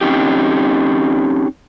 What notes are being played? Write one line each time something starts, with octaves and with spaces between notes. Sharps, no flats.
C4 C#4 D#4 G4